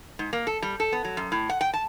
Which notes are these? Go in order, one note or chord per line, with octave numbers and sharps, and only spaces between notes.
G#2
A#3
A4
G3
A4
B3
F#3
F#2
A2
F#5
G5
A5